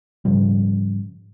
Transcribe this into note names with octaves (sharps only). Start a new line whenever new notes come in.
G#2 C#3 F3 G3